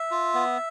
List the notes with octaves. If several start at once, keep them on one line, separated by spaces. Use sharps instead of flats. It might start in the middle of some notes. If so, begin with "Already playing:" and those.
Already playing: E5
F4
B3